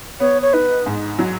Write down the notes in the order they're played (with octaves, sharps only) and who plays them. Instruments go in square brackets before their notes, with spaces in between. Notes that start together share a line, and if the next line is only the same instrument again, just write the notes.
[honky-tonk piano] B3 [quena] C#5
[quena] C#5
[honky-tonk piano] D#4 [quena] B4
[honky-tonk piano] G#2
F#3